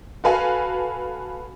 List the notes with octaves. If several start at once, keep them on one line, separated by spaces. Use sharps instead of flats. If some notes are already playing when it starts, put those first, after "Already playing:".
F#4 A4 B4 F5 G#5